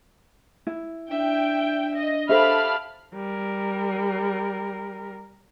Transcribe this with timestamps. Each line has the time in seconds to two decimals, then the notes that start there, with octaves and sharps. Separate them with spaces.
0.67 E4
1.11 D4 E5 G5
1.97 D#5
2.29 G4 A4 C5 E5 F5 A5 B5 F6
3.14 G3 A#4